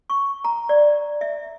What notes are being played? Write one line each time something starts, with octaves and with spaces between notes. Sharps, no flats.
C#6
A#5
D5
E5